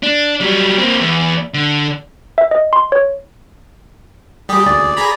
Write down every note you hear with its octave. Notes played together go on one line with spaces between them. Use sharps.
D4
F#3 G3
A#3 C4
E2
D3
E5
D#5
C6
C#5
G3 G4 G#4
D2 D5
G#4 A#5 B5